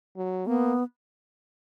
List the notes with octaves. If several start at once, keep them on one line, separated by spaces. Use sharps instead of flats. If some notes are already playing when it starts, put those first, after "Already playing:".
F#3
A#3 B3